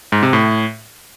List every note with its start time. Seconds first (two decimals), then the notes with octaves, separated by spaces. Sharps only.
0.12 G#2
0.23 C3
0.33 A2